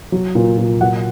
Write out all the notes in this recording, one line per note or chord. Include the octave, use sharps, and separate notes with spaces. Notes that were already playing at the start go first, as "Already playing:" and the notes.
F#3
A#2
A#2
F#3 F#5